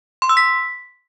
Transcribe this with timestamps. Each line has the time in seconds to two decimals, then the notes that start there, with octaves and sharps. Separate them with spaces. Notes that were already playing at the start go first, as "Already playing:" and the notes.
0.22 C6
0.29 E6
0.37 B6